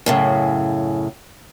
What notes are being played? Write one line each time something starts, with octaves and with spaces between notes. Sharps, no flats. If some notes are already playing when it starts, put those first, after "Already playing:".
F#2 A2 C#3